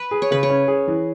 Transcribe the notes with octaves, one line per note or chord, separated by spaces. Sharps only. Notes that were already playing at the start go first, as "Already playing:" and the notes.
Already playing: B4
G#4
C#5
C#3 B4
C#5
C#4
G#4
E3